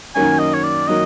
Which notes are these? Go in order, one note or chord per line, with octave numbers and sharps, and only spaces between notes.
F#2 D#3 F#3 A#3 C#4 G#5
D#5
C#5
D5
D#3 F#3 A#3 D#5